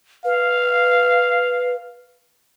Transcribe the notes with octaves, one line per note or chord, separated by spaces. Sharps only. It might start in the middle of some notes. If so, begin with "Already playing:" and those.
B4 F5